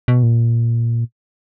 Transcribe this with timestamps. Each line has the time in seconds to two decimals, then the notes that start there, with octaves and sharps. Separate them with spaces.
0.08 B2
0.23 A#2